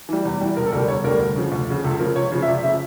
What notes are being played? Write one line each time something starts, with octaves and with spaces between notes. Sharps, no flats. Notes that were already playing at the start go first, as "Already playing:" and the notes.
E3 G3
E2
E3 G3
E1 A#4
A4
D2 D3 G3 A#4
E1 C#5
D2 D3 G3 A#4
D2
C#3 F3
D2
C#3 F3
C#2 A4
C#3 F3 A#4
C#2 C#5
C#3 F3
E5
C#2 D5
C#3 F3 E5